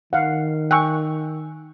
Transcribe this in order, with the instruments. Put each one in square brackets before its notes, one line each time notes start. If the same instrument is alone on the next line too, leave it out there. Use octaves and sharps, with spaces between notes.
[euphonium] D#3 [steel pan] F5 F#5
[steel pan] G5 C#6 [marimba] G#5 E6 F#6